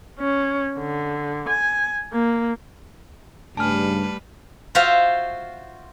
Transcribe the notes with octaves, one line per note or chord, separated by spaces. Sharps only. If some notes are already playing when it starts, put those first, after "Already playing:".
C#4
D3
G#5
A#3
G2 C#3 G3 A3 B4 G#5 A5 F6
F4 F#4 C5 E5 F5